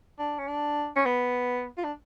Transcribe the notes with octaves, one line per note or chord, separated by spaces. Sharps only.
D4
C#4
D4
C#4
B3
F4
D4